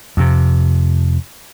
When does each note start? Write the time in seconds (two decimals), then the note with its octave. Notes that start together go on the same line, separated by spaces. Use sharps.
0.17 F2 C3